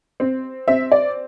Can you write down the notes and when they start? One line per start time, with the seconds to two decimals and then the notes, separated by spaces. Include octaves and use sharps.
0.20 C4
0.68 C4 E5
0.92 D5